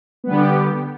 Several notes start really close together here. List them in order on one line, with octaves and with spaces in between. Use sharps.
B3 G3 D3 G4